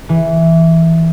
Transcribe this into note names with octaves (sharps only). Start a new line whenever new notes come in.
E3